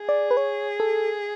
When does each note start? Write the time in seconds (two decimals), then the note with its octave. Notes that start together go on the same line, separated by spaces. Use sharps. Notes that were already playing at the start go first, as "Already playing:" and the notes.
Already playing: G#4
0.09 D5
0.31 B4
0.37 C#5
0.80 A4